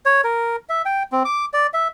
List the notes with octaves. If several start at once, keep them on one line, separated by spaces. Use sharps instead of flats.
C#5
A#4
E5
G5
C4
D6
D5
E5